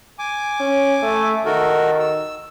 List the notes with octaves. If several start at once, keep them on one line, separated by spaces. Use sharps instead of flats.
G#5 D6
C#4
A3
D#3 F#4 A4 A#4
E6